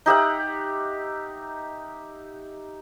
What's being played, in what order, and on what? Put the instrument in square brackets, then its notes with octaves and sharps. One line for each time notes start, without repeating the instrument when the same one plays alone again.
[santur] D#4 G4 E5 F#5